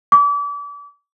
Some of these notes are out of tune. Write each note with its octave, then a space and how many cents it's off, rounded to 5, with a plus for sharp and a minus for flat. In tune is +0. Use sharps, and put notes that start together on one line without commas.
D6 -35